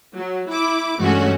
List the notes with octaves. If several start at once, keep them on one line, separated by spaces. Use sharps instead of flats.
F#3
E4 D6
G2 E3 G#3 A3 C#4 F#4